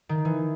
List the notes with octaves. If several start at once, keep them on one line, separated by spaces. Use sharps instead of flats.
D#3
E3